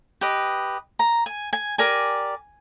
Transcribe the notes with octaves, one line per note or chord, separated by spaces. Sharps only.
G4 B4 D#5
A#5
G#5
G#5
G4 A#4 D5 G#5